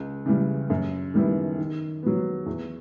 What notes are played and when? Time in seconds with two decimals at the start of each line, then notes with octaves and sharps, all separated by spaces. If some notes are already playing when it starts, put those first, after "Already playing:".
Already playing: C#2
0.26 C#3 E3 G3
0.70 F#2
1.14 D#3 G3 B3 E4
1.58 D#3
2.03 F#3 B3
2.46 E2